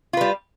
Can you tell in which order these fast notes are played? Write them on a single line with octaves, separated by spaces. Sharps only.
F4 B4 G3